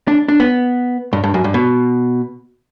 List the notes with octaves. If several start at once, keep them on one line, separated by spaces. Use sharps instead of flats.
D4
D4
B3
G2
G2
F#2
G2
B2